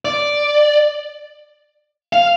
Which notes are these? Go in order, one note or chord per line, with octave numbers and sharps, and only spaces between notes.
D5
F5